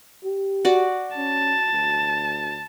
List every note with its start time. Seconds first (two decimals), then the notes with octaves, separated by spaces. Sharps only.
0.24 G4
0.65 F#4 D5
1.17 C#4 A5
1.73 D2